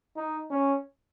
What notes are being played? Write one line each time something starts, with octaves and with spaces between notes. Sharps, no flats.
D#4
C#4